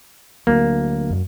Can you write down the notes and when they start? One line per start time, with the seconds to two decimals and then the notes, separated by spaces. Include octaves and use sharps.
0.47 D2 F#3 A#3
1.10 F#2